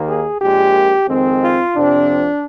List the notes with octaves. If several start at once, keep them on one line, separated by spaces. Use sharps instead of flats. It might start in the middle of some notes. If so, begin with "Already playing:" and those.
Already playing: D#2 D#3 A#3
G#4
A#1 A#2 G#3 G4
F2 D#3 G#3 C4
F4
F2 C3 F3 C4 D4